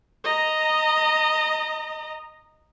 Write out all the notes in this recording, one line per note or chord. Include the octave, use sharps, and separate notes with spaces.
D#5 A#5